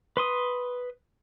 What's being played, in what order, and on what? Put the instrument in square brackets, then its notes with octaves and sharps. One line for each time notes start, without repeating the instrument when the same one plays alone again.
[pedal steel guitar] B4 C6 D#6